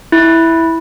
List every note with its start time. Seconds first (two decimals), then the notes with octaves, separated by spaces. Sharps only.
0.12 E4